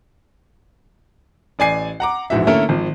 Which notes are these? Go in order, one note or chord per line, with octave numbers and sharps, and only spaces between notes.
A1 D5 G#5 C7
F#5 A#5 D6
A#1 G#2 E3 F#4 E5
D3 A3 A#3 C#4 E4 A#4
G#1 F3